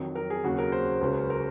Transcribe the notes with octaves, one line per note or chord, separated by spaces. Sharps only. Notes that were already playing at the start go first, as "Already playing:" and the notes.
Already playing: F2 D#3 F#3
A#4
G#4
D#2 C#3 F#3 F#4
A#4
C5
C#2 C#3 F#3
A#4